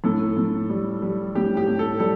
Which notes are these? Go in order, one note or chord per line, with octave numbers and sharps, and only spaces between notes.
A2 A4
A2
G3
G3
A2 G4
G4
A2
A4
G3 A4